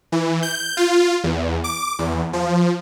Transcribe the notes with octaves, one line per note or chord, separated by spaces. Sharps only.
E3
G6
F4
E2
D6
E2
F3